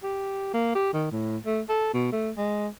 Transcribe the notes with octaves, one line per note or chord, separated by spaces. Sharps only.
G4
A#3
G4
D#3
A2
A3
A4
B2
A3
G#3